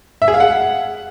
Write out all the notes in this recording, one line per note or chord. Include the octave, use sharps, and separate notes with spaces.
E5
G#4
F5
F#5